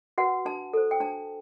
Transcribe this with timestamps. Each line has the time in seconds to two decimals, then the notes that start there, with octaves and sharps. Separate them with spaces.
0.18 F#4 B4 F#5
0.45 D4 A5
0.73 A4 C5
0.91 G5
1.00 D4 A5